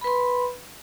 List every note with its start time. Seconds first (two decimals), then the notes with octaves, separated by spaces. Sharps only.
0.01 B5
0.04 B4
0.07 C6